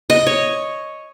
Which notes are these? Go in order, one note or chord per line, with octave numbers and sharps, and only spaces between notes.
D#5
C#5